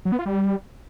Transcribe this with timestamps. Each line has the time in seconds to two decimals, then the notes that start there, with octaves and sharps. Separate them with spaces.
0.05 F#3
0.12 B3
0.19 F4
0.26 G3